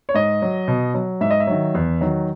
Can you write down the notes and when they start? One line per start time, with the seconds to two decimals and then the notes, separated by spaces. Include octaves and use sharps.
0.09 C#5
0.14 G#2 D#5
0.42 F#3
0.68 B2
0.94 F#3
1.21 G#2 E5
1.31 D#5
1.40 E5
1.47 D#3 F#3
1.75 E2
2.01 D#3 F#3